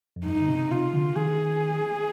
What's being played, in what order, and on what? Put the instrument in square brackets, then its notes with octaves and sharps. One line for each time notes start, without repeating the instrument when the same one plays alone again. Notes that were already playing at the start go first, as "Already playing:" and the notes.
[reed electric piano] F2
[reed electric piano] G2 [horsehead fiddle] D#4
[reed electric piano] D3
C3
[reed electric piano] C3 [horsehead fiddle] F4
[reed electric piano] D3
[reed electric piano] D#3 [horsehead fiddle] G#4